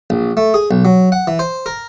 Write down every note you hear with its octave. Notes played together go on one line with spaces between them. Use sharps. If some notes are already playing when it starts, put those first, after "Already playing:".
A#1
A3
G#4
B1
F#3
F#5
E3
C5
A#4